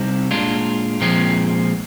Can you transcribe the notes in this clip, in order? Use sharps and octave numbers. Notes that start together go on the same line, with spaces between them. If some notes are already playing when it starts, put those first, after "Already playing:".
Already playing: C3 G3 C4 D#4
A#2 G#3 D4 F4
A#2 F3 G#3 C4